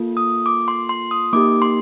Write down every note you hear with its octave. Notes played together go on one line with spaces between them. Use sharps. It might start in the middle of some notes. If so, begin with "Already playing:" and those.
Already playing: A#3 F4 A4
D#6
D6
C6
C6
D#6
A#3 D#4 G4 D6
C6